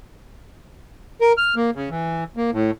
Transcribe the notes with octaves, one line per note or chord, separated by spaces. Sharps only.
A#4
F6
A#3
C#3
E3
A#3
A2